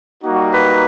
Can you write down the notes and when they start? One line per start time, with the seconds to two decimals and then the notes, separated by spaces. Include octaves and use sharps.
0.23 G3 A#3 D#4 F#4
0.54 B4